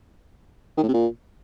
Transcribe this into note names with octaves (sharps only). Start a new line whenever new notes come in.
D#3
A2
C3
A#2